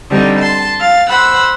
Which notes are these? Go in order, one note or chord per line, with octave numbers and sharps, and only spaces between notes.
D3 G3 C4 D#4
A5 C6
F5 A6
C5 F#5 B5 E6